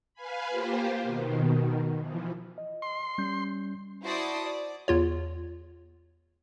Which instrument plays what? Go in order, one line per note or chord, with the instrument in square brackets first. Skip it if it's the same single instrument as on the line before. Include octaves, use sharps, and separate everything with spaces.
[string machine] B4 F5 G#5 B5
A#3 F4 G4 C5
B2 D#3
E3 F3
[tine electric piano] D#5
[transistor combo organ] C6
[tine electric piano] G3 C#4 G6
[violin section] E4 F#4 C5 D5 A5 D#6
D5
[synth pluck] E2 F4 C#5